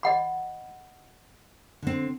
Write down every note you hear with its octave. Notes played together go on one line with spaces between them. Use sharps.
D#5 F#5 B5
D3 C4